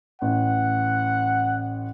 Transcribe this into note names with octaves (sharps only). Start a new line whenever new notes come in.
A1 F#5